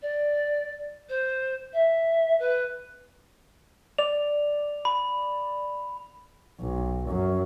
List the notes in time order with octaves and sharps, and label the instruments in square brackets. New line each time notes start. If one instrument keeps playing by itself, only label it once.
[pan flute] D5
C5
E5
B4
[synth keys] D5 [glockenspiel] F7
[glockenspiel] B5
[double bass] B1
F#2